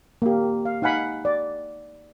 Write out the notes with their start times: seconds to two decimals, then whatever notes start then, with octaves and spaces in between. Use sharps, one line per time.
0.22 A#3 G4
0.65 F5
0.82 D#4 F5 F#5 G#5 B5
1.25 D5